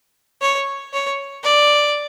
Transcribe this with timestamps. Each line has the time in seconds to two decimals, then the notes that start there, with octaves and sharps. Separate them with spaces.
0.42 C#5
0.93 C#5
1.44 D5